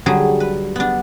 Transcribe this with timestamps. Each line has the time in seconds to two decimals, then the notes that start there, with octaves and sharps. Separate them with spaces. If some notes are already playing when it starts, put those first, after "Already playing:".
0.06 D3 F#3 G3 G#4
0.40 B4
0.76 B3 D4